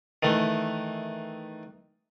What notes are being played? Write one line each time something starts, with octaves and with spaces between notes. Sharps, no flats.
D#3 E3 A3